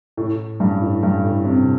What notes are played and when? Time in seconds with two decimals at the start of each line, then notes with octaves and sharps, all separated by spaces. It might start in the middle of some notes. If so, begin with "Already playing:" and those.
0.17 A2
0.60 G2
0.82 A2
1.03 G2
1.24 A2
1.45 C3